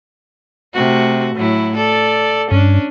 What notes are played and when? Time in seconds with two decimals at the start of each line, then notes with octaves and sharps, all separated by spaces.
0.74 C3 A3 F#4
1.36 A2 F#3 E4
1.77 A4 D5
2.51 G2 C#4 D4